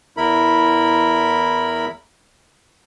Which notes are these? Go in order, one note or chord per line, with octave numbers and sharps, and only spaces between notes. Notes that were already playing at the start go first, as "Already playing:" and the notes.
E2 E4 A#4 B5